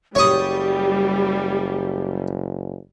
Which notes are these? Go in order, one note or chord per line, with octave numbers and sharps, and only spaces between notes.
F#1 G3 G4 C#5 C#6 D#6